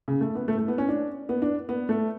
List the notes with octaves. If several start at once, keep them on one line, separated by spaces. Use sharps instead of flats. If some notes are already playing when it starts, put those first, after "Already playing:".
C#3
A3
B3
A3
A3
B3
C#4
D4
B3
D4
B3
A3